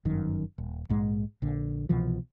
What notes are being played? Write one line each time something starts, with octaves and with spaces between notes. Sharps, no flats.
G1 F#2 D#3
D#1
A#1 G#2 G#3
A#1 D3
C2 B2 E3 F3